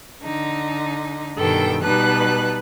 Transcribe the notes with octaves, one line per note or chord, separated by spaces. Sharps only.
D3 D#4
G2 B2 D#3 A4 G5
B2 G3 D#4 B4 A5 F#6